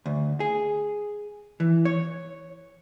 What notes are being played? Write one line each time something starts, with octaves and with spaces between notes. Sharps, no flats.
D2
G#4
E3
C#5